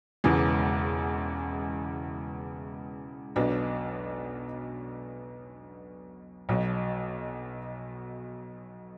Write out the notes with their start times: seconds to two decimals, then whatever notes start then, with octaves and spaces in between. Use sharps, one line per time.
0.24 E1 E2 C#3 E3 G#3
3.36 B1 B2 F#3 B3 D4
6.49 B1 B2 F#3